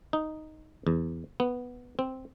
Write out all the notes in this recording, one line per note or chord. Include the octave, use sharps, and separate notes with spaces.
D#4
E2
B3
C4